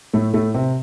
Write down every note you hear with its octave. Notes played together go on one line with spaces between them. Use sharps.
A2 A3
A2 A3
C3 C4